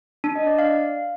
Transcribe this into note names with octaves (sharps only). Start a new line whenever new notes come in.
D4
D#5
D5
F5